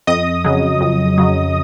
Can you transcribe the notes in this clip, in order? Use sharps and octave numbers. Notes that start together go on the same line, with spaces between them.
F2 D#5 D#6
C#3 F#3
F2
C#3 F#3